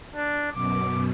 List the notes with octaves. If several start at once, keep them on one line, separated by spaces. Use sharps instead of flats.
D4
F#2 B2 D6